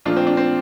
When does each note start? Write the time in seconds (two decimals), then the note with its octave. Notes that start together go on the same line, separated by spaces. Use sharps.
0.05 A#2 F3 A3 D4 F4
0.16 C4
0.27 D4
0.37 C4